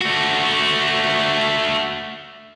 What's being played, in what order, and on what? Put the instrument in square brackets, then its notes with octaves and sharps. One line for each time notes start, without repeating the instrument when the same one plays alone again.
[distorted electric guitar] A3 F#4